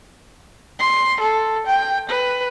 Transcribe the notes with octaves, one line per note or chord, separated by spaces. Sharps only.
C6
A4
G5
B4